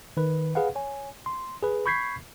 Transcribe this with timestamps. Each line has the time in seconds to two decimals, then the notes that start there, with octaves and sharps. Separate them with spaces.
0.17 D#3 B4
0.55 G#4 B4 F5 F#5
0.75 C#5 G#5
1.26 C6
1.62 G#4 B4
1.86 B5 C#6 G6 G#6 B6 C7